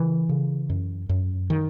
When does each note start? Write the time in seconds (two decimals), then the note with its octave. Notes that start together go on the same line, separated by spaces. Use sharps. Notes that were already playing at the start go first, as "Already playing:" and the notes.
Already playing: C#3 E3
0.29 C#3
0.69 F#2
1.09 F#2
1.50 D#3